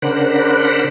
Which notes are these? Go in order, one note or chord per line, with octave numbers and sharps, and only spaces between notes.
C#3 D4 A#4 C5 F#5 B5